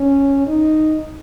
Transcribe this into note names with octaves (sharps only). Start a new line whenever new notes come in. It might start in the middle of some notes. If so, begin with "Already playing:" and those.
Already playing: C#4
D#4